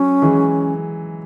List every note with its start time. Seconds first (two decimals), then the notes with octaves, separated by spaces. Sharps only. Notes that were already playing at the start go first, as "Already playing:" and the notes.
Already playing: F#3 C#4
0.22 E3 G#3